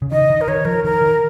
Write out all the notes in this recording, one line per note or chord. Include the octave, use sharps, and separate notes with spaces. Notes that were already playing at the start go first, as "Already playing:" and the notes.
C#3
D#3 D#5
D#3
A#4
D#3 C#5
F3 A#4
D#3 A#4
D#3